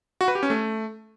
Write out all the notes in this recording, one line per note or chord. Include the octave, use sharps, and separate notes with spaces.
F#4
B4
G4
C#4
A3